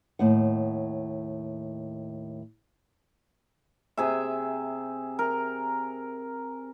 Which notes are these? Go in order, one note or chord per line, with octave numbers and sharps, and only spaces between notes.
D#2 A2 F#5
C3 G#4 E5
A#4